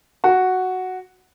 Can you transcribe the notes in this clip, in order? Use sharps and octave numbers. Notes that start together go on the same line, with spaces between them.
F#4